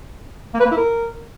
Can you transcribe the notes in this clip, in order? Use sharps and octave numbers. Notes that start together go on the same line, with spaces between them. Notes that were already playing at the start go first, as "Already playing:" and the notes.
A#3
B4
A#3
E4
A#4